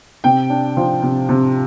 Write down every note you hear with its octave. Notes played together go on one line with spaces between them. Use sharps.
C3 G5
D4
F3
C3
C3